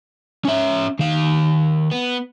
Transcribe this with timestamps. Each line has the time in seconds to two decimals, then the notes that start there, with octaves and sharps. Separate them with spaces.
0.45 C#4 E5
0.99 D#3 F5
1.92 B3